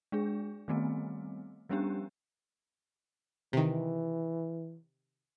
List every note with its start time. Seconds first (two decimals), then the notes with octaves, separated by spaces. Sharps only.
0.12 G#3 D4 G#4
0.68 D#3 G3 A3 B3 C4
1.69 F3 G3 B3 C#4 D4 G4
3.53 C3 D#3 E3